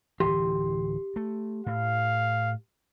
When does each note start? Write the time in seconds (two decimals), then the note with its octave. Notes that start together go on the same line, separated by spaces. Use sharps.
0.20 D1 E3 G4 C6
1.16 A3
1.66 A2 F5